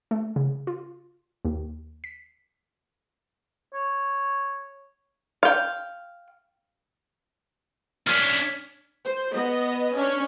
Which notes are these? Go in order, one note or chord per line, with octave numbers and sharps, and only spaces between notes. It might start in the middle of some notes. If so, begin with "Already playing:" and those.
A3
C#3
F4
D#2
B6
C#5
F5 G5
C#4 D4 F6 G#6 B6
C5
B3 D#5
C#4 D4 C#5